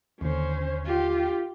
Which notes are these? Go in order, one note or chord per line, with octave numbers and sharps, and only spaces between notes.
D#2 D3 C#4 C5
F4 G4